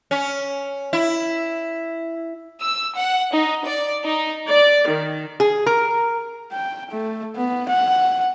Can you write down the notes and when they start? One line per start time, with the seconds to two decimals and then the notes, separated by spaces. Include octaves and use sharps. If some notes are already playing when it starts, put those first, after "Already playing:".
0.11 C#4
0.93 E4
2.61 E6
2.95 F#5
3.33 D#4
3.66 D5
4.04 D#4
4.48 D5
4.88 D#3
5.40 G#4
5.66 A#4
6.52 G5
6.91 A3
7.36 B3
7.69 F#5